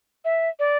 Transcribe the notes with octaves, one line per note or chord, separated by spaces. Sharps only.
E5
D5